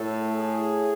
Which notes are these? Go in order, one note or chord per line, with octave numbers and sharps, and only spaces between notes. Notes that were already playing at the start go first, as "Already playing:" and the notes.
Already playing: A2 A4
G#4